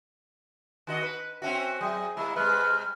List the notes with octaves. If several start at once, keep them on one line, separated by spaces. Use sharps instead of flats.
D#3 F#4 D#5
B4
C4 C#4 F#4 E5 G5
F#3 G#4
G3 A#3 E4
C3 G3 G#3 B4 B5 F6